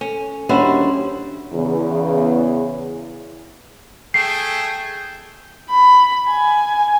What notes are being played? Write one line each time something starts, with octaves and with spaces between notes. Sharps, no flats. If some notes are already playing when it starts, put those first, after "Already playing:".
C#4 A4
D#2 G3 C#4 D4 E4 F#4 G4 C5
E2 C#3
A3 G#4 G5 C7
B5
G#5